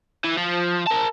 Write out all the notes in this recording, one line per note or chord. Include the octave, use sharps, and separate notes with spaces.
E3
F3
A#4 A5